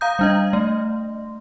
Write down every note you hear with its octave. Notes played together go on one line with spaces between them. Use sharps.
F5 A#5 D#6 G6
G3 D4 D#5
A3